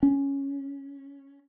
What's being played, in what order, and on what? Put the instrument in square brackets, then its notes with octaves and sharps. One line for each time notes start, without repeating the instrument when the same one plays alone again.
[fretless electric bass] C#4